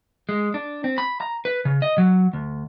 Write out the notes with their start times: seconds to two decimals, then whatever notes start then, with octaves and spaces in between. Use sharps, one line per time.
0.29 G#3
0.54 D4
0.84 C4
0.98 B5
1.21 A#5
1.45 B4
1.65 C#3
1.82 D#5
1.98 F#3
2.33 D2